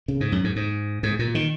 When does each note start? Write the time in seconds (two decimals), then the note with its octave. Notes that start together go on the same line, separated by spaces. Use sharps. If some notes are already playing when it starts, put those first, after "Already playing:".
0.08 C#3
0.21 G#2
0.32 F#2
0.44 G#2
0.56 G#2
1.03 G#2
1.19 A#2
1.35 D#3